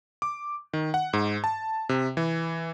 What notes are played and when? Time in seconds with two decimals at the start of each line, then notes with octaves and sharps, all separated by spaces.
0.22 D6
0.73 D#3
0.94 F#5
1.13 G#2
1.44 A5
1.89 C3
2.17 E3